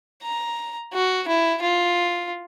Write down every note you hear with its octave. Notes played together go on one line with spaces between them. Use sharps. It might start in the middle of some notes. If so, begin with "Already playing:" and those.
A#5
F#4
E4
F4